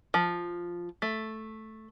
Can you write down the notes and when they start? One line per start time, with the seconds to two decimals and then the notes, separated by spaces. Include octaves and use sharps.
0.14 F3
1.02 A3